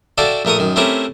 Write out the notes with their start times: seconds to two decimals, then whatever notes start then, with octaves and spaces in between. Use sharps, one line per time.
0.18 F#4 A4 D5 E5 F5 G5
0.45 A#1 A3 A#4 C#6 D#6
0.59 F#2 D#3
0.76 A3 C4 C#4 E4 G4 A#4